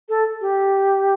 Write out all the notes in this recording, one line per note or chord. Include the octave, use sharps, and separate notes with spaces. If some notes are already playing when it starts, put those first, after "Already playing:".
A4
G4